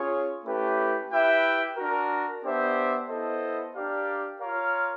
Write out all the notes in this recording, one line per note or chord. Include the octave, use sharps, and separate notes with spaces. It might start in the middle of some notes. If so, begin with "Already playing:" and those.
Already playing: C#4 F4 G#4 C#5
A3 C#4 E4 G4 B4
E4 G4 B4 E5 G5
D4 F#4 A#4
B3 D4 G4 C5 E5
B3 E4 A4 C5 D#5
D4 G4 A#4 D5 F5
F4 A#4 C#5 F5